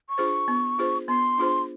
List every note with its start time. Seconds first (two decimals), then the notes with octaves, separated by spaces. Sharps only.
0.09 C#6
0.18 D4 F4 G#4 C5
0.48 B3
0.78 D4 F4 G#4 C5
1.08 B3 C6
1.38 D4 F4 G#4 C5